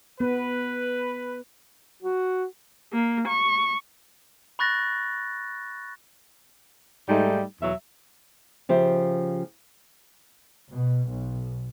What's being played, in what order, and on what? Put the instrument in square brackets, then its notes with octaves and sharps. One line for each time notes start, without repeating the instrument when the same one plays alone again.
[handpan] B3 [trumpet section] B4
[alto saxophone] F#4
[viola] A#3
C#6
[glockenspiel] B5 C#6 F#6 A6 A#6
[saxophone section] G#2 G3 A3 D#4
E2 B2 F#3 E5
[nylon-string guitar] C#3 F3 G4 E5
[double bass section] B2
B1